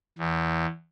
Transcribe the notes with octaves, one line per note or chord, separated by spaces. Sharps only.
E2